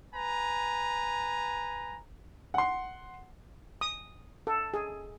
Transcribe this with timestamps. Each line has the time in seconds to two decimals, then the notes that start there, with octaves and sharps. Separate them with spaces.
0.15 B4 G#5 A#5
2.54 F#5 C6
3.81 D#6
4.47 A4
4.74 G#4